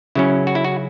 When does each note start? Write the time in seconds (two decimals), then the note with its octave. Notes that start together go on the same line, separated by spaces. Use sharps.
0.15 C#3 F#3 C#4 E4
0.47 F#4
0.55 E4
0.64 F#4